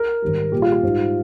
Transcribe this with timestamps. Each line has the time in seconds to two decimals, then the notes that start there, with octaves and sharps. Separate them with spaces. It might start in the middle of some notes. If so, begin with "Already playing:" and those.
Already playing: A#4
0.22 G#2 D#3 G3
0.52 A#2 G3 G4
0.62 F4
0.72 F4
0.83 G#2 G3